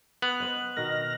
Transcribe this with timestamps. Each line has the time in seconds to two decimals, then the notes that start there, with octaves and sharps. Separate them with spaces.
0.22 B3 F#6 F7 F#7
0.40 B4 C5 D#5
0.77 B2 D#3 A#4 F6 A#6